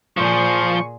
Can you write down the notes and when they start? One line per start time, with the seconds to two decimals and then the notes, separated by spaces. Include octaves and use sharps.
0.17 A#2 F3 G#4 C5 C#6